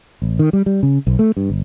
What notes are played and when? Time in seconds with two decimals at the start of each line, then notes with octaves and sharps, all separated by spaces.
0.22 A1
0.39 D#3
0.53 G3
0.66 G3
0.83 C#3
1.07 B1
1.19 A3
1.37 G2
1.50 G1